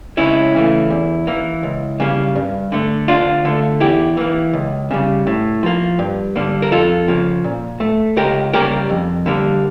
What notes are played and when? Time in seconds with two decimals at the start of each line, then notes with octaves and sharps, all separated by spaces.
0.17 C#2 C#4 E4
0.54 C#3 E3 A3
0.90 E2
1.27 E3 A#3
1.63 C#2
2.00 C#3 G3 A#3
2.35 G2
2.72 D3 A3
3.08 D2 D4 F4
3.45 D3 A3
3.80 E2 E4 G4
4.17 E3 A#3
4.53 C#2
4.91 C#3 G3
5.27 A2
5.63 F3 A#3
5.99 G2
6.36 D3 G3 A#3
6.62 A#4
6.71 F2 F4 A4
7.08 C#3 F3 A#3
7.44 A#2
7.80 A3
8.17 C#2 G4 A#4
8.53 C#3 G3 A#3 G4 A#4
8.89 F2
9.26 D3 G3 A#3